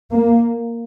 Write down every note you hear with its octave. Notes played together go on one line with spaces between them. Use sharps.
A#3